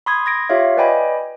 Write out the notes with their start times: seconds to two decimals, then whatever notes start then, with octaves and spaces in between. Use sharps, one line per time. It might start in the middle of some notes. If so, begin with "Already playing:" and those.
0.06 B5 C6 D#6 G#6
0.26 G#6 A#6 D7
0.49 F4 G4 C#5 E5 F5
0.77 B4 D5 D#5 G5 G#5 B5